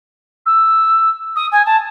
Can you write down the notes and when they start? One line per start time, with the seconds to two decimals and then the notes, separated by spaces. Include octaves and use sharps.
0.46 E6
1.36 D#6
1.52 G#5
1.66 A5